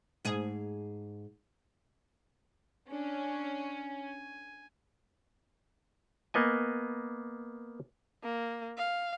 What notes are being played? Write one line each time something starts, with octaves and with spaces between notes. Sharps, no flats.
G#2 G#4
C#4 D4
G#5
A#3 B3 D#5 G#5
A#3
F5